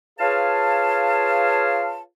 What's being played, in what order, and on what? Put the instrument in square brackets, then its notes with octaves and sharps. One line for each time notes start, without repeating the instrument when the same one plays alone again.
[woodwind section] F4 G#4 B4 C#5 F5 A5